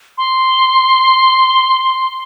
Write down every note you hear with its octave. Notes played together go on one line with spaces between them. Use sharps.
C6